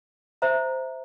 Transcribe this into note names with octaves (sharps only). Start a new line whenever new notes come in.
C5 E5 A#5